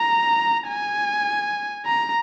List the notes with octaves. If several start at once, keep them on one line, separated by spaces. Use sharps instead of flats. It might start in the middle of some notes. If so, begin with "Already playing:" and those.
Already playing: A#5
G#5
A#5